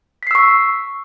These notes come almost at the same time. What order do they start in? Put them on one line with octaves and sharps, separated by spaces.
B6 C7 E6 C#6